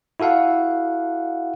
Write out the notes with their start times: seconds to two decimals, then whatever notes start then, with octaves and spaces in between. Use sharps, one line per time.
0.20 E4 F#4 A4 F5 F#5